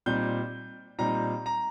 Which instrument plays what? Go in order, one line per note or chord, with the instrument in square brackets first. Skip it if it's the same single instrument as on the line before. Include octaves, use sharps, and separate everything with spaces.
[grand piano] A#2 G3 C4 D#4 G6
A#2 G3 C4 D#4 A#5
A#5